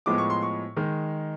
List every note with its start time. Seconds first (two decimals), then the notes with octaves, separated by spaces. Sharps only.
0.06 A2 F3 G#3 B3 D6
0.18 C#6
0.30 C6
0.42 C#6
0.76 D#3 G#3